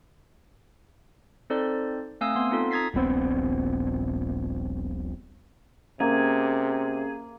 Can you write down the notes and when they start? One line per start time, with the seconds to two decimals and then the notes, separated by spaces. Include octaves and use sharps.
1.50 C4 D#4 A4 C5 D5
2.21 A3 C4 F5 G#5 D#6 E6
2.36 B3 F5 C6
2.51 C4 D#4 F4 A4
2.71 A#5 D#6 G#6 A6 B6 C7
2.94 D#1 A#1 B3 C4
6.00 C3 A#3 C#4 G#4 A#4